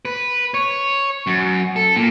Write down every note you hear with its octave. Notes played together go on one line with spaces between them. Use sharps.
B4
C#5
F#2
A4
A#2